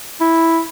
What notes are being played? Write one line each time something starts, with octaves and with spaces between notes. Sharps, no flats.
E4